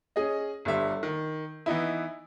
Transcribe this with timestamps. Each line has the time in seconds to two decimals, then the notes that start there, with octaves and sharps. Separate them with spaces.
0.16 C#4 G#4 D#5
0.65 G1 G2 D3 E5
1.03 D#3
1.66 E3 B3 D#4 E4